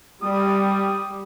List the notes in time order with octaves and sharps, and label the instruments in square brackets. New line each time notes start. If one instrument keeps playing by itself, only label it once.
[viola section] G3 [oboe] D#6